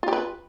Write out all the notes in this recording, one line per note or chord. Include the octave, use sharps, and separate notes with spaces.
F4 G4 B4